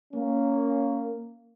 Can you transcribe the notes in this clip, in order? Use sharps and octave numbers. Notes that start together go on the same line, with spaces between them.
A#3 C#4